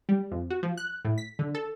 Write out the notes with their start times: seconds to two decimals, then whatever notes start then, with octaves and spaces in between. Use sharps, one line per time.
0.09 G3
0.31 F2
0.50 F#4
0.63 F3
0.77 F#6
1.05 A2
1.18 B6
1.39 D3
1.55 A4